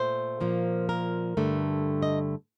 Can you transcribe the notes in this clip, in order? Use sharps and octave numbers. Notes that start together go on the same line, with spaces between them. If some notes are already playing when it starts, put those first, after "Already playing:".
Already playing: A#2 A3 C5
A#2 F3 A#3
A#4
G2 D3 A3
D#5